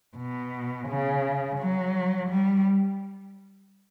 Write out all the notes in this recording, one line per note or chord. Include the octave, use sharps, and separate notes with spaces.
B2
C#3
F#3
G3